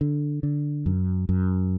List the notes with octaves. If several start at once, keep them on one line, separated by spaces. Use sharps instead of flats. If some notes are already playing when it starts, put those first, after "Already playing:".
D3
D3
F#2
F#2